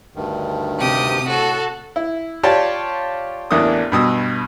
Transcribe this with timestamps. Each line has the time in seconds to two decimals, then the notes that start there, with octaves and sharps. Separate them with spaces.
0.15 D2 G2 D#3
0.80 C3 G4 D#6
1.27 A2 F#4 A4
1.96 E4
2.43 F4 G4 C#5 D5 A5
3.51 A1 E2 A#3 D4 D#6
3.92 G2 B2 D#6 E6